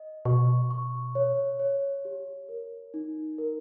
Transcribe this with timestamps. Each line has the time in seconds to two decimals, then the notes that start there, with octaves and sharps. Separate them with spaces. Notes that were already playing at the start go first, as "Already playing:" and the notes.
Already playing: D#5
0.25 B2 C#6
0.71 C#6
1.15 C#5
1.59 C#5
2.05 G4
2.49 A#4
2.94 D#4
3.38 A#4